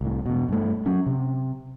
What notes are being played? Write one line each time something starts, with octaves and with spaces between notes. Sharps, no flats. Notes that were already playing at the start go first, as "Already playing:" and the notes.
C2 A2
E2 B2
G2 A3
F#3 C#4
C3